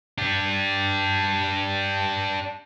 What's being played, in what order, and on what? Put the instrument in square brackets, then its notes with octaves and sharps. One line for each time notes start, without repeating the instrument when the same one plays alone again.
[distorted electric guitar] D4 G4